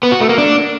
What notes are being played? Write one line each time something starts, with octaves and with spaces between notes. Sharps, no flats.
B3
F#4
A3
A#3
D4